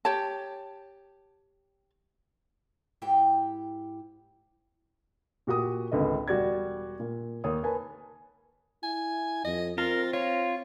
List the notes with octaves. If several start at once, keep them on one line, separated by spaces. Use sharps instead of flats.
G4 C#5 A5
G#2 E4 G4 G5
A#2 F#4 G4 D#6
G#1 C#2 D3 B4 D#5
E1 G3 F#4 D5 G#6
A#2
D#2 C#5 D#6
A#4 B4 G#5 A5
E4 G#5
F2 D#5
C4 F4 A#4
F4 C#5